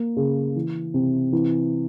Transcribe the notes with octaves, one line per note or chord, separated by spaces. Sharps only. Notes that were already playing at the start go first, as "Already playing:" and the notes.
Already playing: A#3
C#3
E3
C3
E3